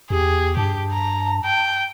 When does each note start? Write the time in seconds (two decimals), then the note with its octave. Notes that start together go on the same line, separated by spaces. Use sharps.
0.10 E2 G4 G#4
0.57 G2 G4 A5
0.92 A#5
1.45 G5